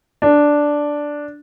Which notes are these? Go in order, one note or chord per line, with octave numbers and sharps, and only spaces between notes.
D4